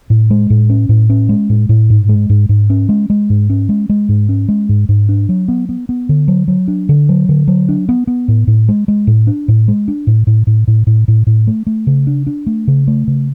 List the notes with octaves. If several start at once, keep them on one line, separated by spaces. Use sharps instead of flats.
A2
G#3
A2
C#4
A2
C#4
G#3
A2
A2
G#2
G#3
G#2
G#2
C#4
G#3
G#3
G#2
C#4
G#3
G#3
G#2
C#4
G#3
G#2
G#2
D4
F#3
B3
B3
B3
D3
F#3
F#3
D4
D3
F#3
D3
F#3
D4
B3
B3
A2
A2
G#3
G#3
A2
D4
A2
G#3
D4
A2
A2
A2
A2
A2
A2
A2
A3
A3
C#3
D4
D4
A3
C#3
A3
C#3